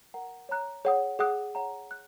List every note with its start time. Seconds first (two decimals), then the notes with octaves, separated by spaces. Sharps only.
0.14 A#4 F#5 A#5
0.49 C#5 A#5 F#6
0.85 G#4 C#5 F#5 D#6
1.19 G#4 F#5 D#6 F#6
1.55 C#5 F#5 A#5
1.91 F#6